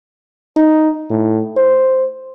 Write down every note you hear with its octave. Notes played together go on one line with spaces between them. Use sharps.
D#4
A2
C5